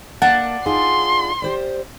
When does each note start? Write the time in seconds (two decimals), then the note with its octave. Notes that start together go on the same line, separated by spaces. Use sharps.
0.22 A#3 D4 F#5 A5
0.66 D#4 F4 G#4 C6
1.42 G4 C5 D5